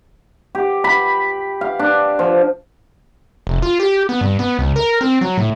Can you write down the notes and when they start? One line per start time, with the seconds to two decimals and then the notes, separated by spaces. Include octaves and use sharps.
0.55 G4
0.84 B5
1.61 F5
1.79 D4
2.19 F3
3.47 F1
3.62 F4
3.80 G4
4.09 B3
4.21 G2
4.39 B3
4.59 C#2
4.76 A#4
5.01 C4
5.21 F#3
5.37 A2